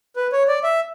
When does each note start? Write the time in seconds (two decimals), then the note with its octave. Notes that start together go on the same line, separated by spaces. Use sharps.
0.16 B4
0.32 C#5
0.48 D5
0.64 E5